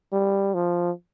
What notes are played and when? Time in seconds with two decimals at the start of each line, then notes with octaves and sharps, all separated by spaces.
0.13 G3
0.54 F3